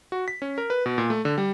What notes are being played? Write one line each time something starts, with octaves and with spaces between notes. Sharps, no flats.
F#4
B6
C#4
A#4
B4
B2
A#2
A3
D3
G3